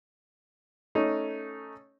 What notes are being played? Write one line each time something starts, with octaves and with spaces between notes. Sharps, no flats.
A3 C#4 D#4